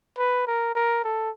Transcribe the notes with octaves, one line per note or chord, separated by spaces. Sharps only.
B4
A#4
A#4
A4